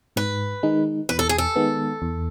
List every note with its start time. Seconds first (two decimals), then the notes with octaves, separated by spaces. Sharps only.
0.16 G#2 B4
0.63 D#3 G#3 D#4
1.09 E2 B4
1.19 A4
1.29 G#4
1.38 A4
1.56 D#3 G#3 B3
2.02 E2